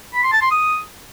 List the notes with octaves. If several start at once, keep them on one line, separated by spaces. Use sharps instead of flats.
B5
C6
A5
C6
D#6